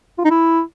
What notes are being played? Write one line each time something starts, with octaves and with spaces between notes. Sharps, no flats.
F4
D#4
E4